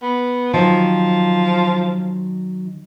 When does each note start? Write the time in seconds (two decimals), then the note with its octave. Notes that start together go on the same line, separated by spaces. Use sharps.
0.02 B3
0.53 D#3 F3 F#3